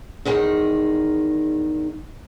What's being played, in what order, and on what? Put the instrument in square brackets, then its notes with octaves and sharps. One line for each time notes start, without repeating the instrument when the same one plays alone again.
[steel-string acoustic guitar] E2 D#3 D#4 G#4